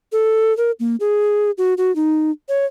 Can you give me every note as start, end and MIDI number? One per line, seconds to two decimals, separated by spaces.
0.12 0.56 69
0.57 0.71 70
0.80 0.96 58
1.00 1.51 68
1.58 1.74 66
1.78 1.94 66
1.96 2.31 63
2.49 2.65 73